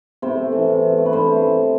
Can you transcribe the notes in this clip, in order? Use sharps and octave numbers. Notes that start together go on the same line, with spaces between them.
C3 C5
A3
E3
C3
C3
A3
B4
G2 C5
A3
E3